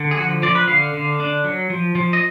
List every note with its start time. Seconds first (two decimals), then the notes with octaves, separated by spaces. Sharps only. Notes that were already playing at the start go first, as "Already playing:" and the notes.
Already playing: D3
0.11 G#4
0.17 F3 F#4
0.42 F3 D5
0.55 B4
0.68 D3 F5
0.94 D3
1.20 D4
1.44 F#3
1.70 F3
1.95 F3
2.13 D#5